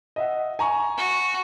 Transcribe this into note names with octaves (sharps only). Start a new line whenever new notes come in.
D#5 E5 F#5
G#5 A#5 C#6
F#4